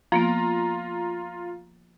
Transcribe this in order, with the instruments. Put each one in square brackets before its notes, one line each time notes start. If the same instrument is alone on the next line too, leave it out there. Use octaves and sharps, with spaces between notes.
[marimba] F3 A#3 B3 [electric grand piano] F4 A#5